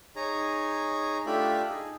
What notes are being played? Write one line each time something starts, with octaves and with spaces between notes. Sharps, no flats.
D#4 G#4 C#5 A#5
A3 D4 F4 G4 E5 B5
D#4 G#4